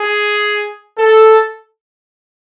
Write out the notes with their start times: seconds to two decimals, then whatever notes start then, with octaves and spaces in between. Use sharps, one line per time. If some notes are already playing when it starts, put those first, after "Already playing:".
Already playing: G#4
0.99 A4